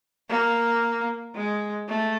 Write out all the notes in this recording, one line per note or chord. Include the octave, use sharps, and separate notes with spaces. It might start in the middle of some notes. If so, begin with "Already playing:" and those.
A#3
G#3
A3